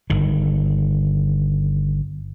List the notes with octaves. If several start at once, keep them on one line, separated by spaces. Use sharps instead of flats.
G1 D#3